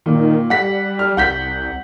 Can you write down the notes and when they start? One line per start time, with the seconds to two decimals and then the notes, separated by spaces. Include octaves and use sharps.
0.06 A#2 D#3
0.50 G3 F#5 B6
0.99 F6
1.17 C2 F#5 G6 B6